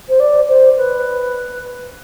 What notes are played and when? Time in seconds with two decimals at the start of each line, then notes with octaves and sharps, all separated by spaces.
0.08 C5
0.19 D5
0.48 C5
0.77 B4